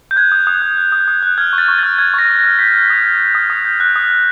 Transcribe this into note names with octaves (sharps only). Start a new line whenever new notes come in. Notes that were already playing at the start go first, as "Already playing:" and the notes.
G6
F#6 G#6
D#6
D#6
F#6
F#6
D#6
D#6
F#6
F6 G#6
C#6
A6
C#6
F6 A6
F6 G#6
C#6 A#6
C#6
A#6
F6
G6 B6
D#6
D#6
G6
G6
D#6
D#6
G6
F#6
D#6
D#6